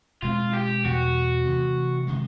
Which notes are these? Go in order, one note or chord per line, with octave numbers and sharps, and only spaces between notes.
B2 G#3 C4 F4
G4
E2 B2 G3 F#4
C3 E3 A3
C3 D#3 G#3